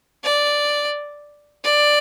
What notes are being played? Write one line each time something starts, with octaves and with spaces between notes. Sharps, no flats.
D5
D5